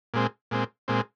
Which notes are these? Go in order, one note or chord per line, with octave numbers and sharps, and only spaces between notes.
A#2 G#3 C4
A#2 G#3 C4
A#2 G#3 C4